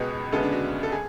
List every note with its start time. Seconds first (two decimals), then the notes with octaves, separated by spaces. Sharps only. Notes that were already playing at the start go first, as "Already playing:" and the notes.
Already playing: C#2 B2 G#3 B3 B4
0.32 D2 C#3 G#3 B3 A4
0.43 D4
0.52 F#4
0.83 A4
0.92 G#4